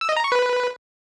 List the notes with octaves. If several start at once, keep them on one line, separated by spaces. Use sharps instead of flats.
E6
D#5
A#5
C#6
B4